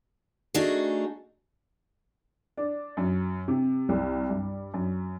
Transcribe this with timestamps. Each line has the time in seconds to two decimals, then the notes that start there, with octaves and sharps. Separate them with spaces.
0.54 A3 D4 D#4 F#4 G#4
2.57 D4
2.97 F#2
3.48 C3
3.89 C2
4.30 G2
4.74 F#2